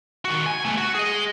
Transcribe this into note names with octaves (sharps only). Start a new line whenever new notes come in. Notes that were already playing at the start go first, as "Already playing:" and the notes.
D#3 F#4
G#5
A3 B3
F#4
G#4 D#5